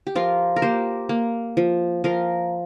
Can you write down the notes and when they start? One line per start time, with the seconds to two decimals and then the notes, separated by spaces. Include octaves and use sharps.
0.07 G4
0.15 F3 F4 A#4
0.56 A#4
0.62 A#3 G4 C5
1.09 A#3
1.57 F3
2.04 F3 F4 A#4